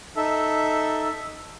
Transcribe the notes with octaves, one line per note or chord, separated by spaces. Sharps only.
D#4 A4 E5